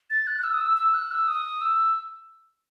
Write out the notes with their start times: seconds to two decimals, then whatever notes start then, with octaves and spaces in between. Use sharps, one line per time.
0.10 A6
0.27 F#6
0.39 F#6
0.44 E6
0.54 D#6
0.61 E6
0.77 E6
0.94 F#6
1.11 E6
1.28 D#6
1.61 E6